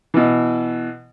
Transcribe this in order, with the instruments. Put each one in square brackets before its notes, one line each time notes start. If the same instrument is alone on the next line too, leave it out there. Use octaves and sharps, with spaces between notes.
[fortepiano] B2 E3